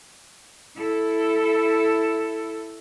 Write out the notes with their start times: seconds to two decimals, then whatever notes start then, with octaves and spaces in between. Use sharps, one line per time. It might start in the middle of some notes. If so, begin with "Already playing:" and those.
0.77 E4 A4